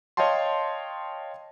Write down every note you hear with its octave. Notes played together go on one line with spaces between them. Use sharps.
C#5 D#5 F5 G5 A5 C6